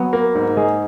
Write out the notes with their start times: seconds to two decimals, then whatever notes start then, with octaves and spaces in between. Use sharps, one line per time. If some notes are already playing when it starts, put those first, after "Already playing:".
Already playing: F#3 B3
0.13 A#3
0.35 G#2
0.57 G#3 G#4